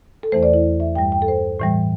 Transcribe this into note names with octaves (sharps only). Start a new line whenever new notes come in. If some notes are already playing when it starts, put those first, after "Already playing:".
A4
E2 E3 A3 C5
D5
E4
E5
G2 G3 G5
G5
A4
C5
A2 E3 G3